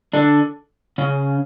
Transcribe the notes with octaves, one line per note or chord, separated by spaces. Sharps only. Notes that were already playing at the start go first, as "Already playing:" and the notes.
D3 D4
C#3 C#4